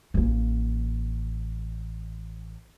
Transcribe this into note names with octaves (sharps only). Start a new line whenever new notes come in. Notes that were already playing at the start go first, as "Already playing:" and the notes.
A1 A#3